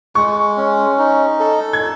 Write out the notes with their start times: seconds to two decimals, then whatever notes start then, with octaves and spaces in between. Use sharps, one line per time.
0.15 G#3 C#6
0.57 C#4
0.98 D#4
1.40 A4
1.73 G#6